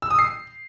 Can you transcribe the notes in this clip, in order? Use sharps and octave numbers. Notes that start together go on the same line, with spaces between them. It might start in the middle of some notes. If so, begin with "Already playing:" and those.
E6
D#6
C7